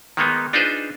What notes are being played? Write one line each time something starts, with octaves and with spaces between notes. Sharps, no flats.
D#3 G#3 A#3 B3 D#4
D4 D#4 F4 G#4 B4 C5